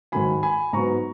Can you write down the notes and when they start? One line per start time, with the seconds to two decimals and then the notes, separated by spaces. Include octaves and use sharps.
0.12 G#2 D#3 F#3 G#5 B5
0.43 G#5 B5
0.73 G#2 F#3 B3 A#5 C#6